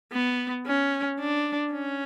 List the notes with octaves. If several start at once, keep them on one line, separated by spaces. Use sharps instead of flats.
B3
C#4
D4
C#4